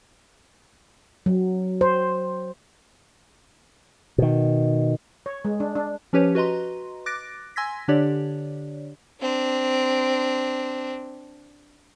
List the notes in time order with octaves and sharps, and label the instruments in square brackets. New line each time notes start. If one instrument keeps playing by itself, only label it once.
[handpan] F#3
C5
[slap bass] B2 D#3
[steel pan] C#5
G#3
D4
D4
[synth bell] F3 C#4 G4 B4 C#5
F#4 B4 D#5 A#5 C6
D6 F#6 A6 A#6 D7
G#5 C6 E6 G#6 A#6 B6
D3 D4 G4 C#5 D5
[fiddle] C4 D4